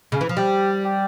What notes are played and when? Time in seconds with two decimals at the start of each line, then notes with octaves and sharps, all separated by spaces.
0.12 C#3
0.21 E3
0.29 F3
0.37 G3 G4
0.85 G4